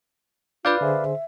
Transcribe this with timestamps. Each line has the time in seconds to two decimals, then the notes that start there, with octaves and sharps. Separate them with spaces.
0.65 D4 F4 B4 D5 F5 D6 G6
0.81 D3 G#4 C5 E5